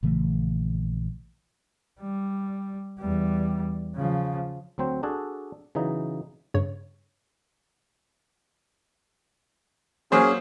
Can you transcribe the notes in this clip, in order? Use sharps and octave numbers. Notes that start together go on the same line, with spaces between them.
A#1 C#3 E3 A3
G3
E2 G3
C#3 F3
D2 F#3 C4 C5
D4 F#4 G#4 A4
C#3 E3 F#3 D#4
G2 C#3 C#5
F#3 A#3 C#4 G#4 C5